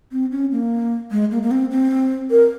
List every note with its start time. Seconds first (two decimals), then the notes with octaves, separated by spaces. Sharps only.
0.12 C4
0.32 C#4
0.52 A#3
1.11 G#3
1.31 A#3
1.43 A#3
1.51 C4
1.71 C4
2.31 A#4